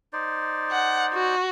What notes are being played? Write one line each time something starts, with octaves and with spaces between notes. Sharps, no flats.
D#4 C5 D5
F#5
F#4